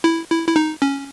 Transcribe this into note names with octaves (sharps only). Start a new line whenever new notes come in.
E4
E4
E4
D#4
C#4